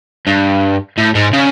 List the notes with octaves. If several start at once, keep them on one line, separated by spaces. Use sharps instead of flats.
G2
A2
G#2
C#3